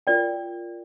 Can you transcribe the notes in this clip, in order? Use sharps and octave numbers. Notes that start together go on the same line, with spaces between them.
F4 A#4 D5 G5